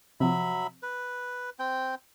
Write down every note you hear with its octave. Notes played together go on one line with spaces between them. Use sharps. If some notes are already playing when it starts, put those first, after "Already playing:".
C3 F3 F#3 E5 B5
B4
C4 G5